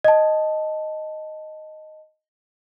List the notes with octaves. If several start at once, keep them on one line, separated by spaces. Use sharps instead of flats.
D#5 A5